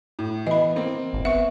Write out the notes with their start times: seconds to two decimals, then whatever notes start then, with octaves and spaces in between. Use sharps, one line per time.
0.19 A2
0.47 E3 B3 D#5 B5
0.76 A#3 C4
1.13 G#1
1.25 B3 E5 C#6